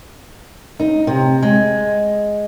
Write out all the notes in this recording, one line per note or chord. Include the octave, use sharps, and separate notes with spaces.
D#4
C3
G#3